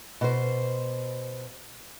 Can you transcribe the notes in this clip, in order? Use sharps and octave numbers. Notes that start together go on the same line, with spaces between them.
B2 C5